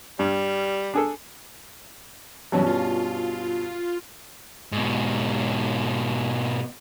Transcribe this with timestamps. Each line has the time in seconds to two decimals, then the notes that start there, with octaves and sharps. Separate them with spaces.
0.19 G2 G3
0.94 D4 G#4 A4
2.52 G2 B2 E3 F#3 C#4
2.66 F4
4.72 G#2 B2